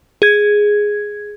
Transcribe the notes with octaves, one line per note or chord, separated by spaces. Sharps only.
G#4 G#6